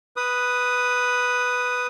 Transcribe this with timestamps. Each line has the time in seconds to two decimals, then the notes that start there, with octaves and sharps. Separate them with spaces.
0.16 B4 D#6